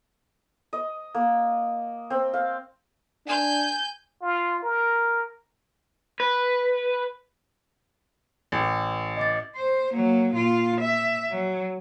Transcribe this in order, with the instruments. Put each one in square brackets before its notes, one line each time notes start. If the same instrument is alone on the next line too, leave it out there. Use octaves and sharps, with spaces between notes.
[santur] D#5
A#3
C4
F5
[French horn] D4 [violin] G#5 G6
[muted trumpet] F4
A#4
[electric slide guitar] B4
[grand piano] A1
[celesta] D#5 D6 A6
[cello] C5
F#3 A#3
A#2 F4
E5
F#3